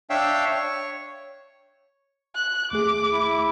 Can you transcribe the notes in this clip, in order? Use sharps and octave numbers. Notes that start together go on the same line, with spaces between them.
D4 C#5 E5 F5 G5
C#5
F#6
D#2 A3 G#4 D6
E4